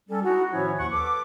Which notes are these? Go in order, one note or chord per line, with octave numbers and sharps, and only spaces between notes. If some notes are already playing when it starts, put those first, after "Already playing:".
G3 C#4 A4
D#4 E4 F#4
A2 D#3 F3 C#4 E4 C#5
D#2 F#5 C#6
A4 B4 D6